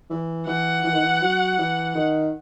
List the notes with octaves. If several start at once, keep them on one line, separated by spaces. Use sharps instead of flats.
E3
E3 F#5
E3
D#3
E3
F#3
E3
D#3